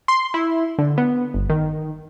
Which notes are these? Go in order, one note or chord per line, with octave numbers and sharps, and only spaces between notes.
C6
E4
D3
B3
G1
D#3